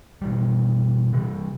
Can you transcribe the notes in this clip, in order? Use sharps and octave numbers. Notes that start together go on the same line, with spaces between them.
B2 E3 G3
C3 E3 G3